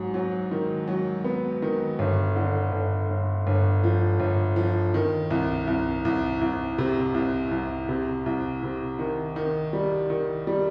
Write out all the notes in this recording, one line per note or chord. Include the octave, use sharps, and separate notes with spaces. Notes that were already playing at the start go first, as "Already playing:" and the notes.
Already playing: G#2 F#3
F#3
D#3
F#3
B3
D#3
G1
D3
G1
G1
G1
F3
G1
F3
D#3
C2
C2
C2
C2
C3
C2
C2
C3
C2
C3
D#3
D#3
G3
D#3
G3